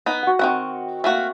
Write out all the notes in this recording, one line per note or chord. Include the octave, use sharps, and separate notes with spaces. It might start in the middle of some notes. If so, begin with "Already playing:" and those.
B3 D#4
F#4 F#5
D#3 C4 E4 F#5 C#6
A3 A#3 F#4